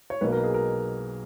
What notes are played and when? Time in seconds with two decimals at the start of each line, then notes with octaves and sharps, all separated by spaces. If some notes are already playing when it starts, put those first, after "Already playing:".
0.10 C#5
0.21 B1 B2 A#3 B4
0.32 A#4
0.44 G#4
0.54 A#4